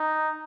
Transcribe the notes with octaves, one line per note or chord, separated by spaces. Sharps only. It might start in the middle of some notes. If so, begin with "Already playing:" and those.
Already playing: D#4